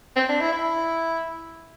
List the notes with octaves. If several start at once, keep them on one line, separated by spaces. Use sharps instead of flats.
C4
D4
E4
E4